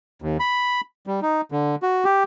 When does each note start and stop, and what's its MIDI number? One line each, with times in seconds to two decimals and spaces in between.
0.22 0.37 39
0.40 0.81 83
1.07 1.20 55
1.22 1.41 63
1.52 1.75 50
1.83 2.04 66
2.04 2.23 67